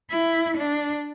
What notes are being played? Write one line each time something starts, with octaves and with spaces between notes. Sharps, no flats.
E4
D4